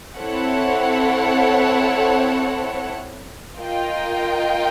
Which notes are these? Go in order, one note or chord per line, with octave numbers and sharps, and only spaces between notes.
C4 E4 A4 C#5 F#5
F4 A#4 D#5 G5